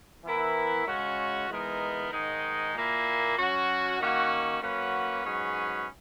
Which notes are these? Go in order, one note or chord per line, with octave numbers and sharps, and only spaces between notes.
E3 B3 E4 A#4
C#3 G#3 C#4 F#4
E3 G#3 B3 D#4 A#4
G#2 D#3 G#3 D#4
A#2 A#3 E4
F#3 C#4 F#4
D#3 A#3 C#4 F#4
F#3 A#3 C#4 F#4 B4
G#2 F#3 C#4 G#4 B4